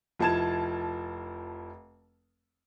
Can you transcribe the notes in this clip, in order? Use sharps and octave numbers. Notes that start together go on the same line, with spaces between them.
F1 F3 E4 A5 G#6 E7